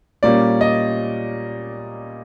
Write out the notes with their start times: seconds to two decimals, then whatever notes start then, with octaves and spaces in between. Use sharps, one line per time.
0.23 A#2 G3 A#3 C#4 D5
0.61 D#5